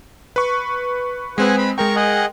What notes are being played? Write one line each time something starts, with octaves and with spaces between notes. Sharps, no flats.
B4 C#6
G#3 C4 G#4 B4 F#5 G#5
B5
G#3 A#4 G5 A#5 C#6
G#4 D#5 F#5